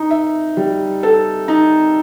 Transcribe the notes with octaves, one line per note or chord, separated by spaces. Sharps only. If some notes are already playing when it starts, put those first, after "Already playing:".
Already playing: D#4
E5
G3
A4
D#4